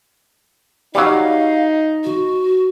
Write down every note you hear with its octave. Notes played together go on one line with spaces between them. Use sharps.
F#3 G3 D#4 F5
F#4